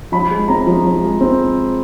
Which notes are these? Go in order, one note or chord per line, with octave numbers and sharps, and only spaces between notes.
F3 B5
G#3
C4 A#5
F3
F3
G#3
C4